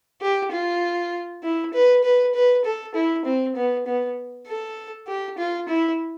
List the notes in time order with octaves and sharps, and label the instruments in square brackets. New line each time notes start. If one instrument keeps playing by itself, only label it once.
[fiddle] G4
F4
E4
B4
B4
B4
A4
E4
C4
B3
B3
A4
G4
F4
E4